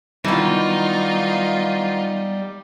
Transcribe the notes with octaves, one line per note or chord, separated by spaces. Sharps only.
D#3 E3 F#3 G3 B3 D#4 F4 F#5